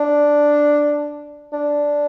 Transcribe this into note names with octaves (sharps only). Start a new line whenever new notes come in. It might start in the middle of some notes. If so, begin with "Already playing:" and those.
Already playing: D4
D4